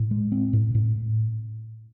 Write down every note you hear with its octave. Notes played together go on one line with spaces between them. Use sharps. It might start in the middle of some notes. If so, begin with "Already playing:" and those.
Already playing: A2
G#3
C4
A2
A2